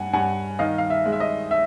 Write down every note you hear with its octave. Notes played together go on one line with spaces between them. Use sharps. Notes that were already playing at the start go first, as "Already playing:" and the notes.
Already playing: G2 F#5 G#5
G2 F#5 G#5
D#3 D#5 F5
F5
E5
G#3
E5
D#5
E5